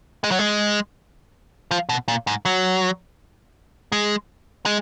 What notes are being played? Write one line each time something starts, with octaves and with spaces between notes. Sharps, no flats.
G#3
F#3
G#3
F3
B2
A#2
G#2
F#3
G#3
G#3